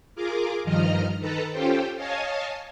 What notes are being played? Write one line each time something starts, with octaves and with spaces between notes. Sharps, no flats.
F4 G#4 A#4 D6
G2 D#3 F3 D#5 A#5 F6
D#3 A4 B4 A5 A#5
C#4 F4 G4 A4 C5 G5
C#5 D#5 F5 G#5 A5